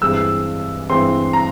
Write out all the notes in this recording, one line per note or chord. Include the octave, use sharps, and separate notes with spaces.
G2 E3 G#3 C4 E6
G2 E3 G#3 C4 C6
A#5